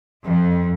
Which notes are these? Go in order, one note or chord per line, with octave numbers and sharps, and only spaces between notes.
F2